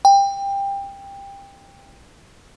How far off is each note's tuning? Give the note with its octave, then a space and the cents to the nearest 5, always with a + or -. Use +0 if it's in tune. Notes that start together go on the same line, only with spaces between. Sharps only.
G5 +20